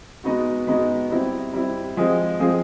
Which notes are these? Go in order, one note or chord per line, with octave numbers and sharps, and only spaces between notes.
G#3 B3 D#4 F#4
G#3 B3 D#4 F#4
G3 C4 E4
G3 C4 E4
F3 G#3 C4 F4 G#4
F3 G#3 C4 F4 G#4